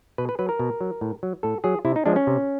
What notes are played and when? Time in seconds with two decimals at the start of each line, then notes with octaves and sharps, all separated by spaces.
0.18 B2 B4
0.29 B4
0.39 F#3 B4
0.49 A#4
0.60 B2
0.81 F#3
1.01 A2
1.23 F#3
1.43 A2 A4
1.64 F#3 G#4
1.85 C3 E4
1.96 D#4
2.06 F3 G#3 D4
2.16 C#4
2.27 C3